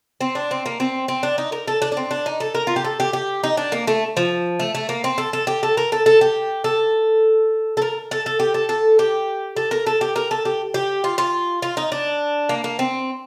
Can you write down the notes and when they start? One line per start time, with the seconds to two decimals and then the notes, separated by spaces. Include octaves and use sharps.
0.21 C4
0.35 D4
0.51 C4
0.66 A#3
0.80 C4
1.08 C4
1.23 D4
1.38 D#4
1.52 A#4
1.68 A4
1.82 D4
1.92 D4
1.97 C4
2.11 D4
2.26 D#4
2.40 A4
2.55 A#4
2.67 F4
2.76 G4
2.85 A4
3.00 G4
3.13 G4
3.44 D#4
3.57 D4
3.72 A#3
3.87 A3
4.17 F3
4.60 A3
4.75 A3
4.89 A#3
5.04 C4
5.18 A4
5.33 A4
5.47 G4
5.63 A4
5.77 A#4
5.92 A4
6.06 A4
6.21 G4
6.64 A4
7.77 A4
7.82 A#4
8.11 A4
8.26 A4
8.40 G4
8.54 A4
8.69 A4
8.99 G4
9.57 A4
9.71 A#4
9.87 A4
10.01 G4
10.16 A#4
10.31 A4
10.45 G4
10.74 G4
11.04 F4
11.18 F4
11.62 F4
11.77 D#4
11.92 D4
12.49 A#3
12.64 A#3
12.79 C4